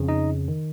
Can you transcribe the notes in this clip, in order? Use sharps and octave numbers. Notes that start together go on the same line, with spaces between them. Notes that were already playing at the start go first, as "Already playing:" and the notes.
Already playing: F2 C#3
D#4 D#5
D#3